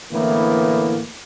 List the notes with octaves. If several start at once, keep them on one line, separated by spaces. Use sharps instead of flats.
A2 D3 E3 A#3 B3